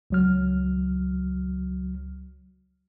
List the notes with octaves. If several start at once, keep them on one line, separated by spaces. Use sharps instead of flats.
C#2 F#3 F6